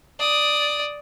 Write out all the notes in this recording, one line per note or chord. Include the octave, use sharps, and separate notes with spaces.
D5 D#6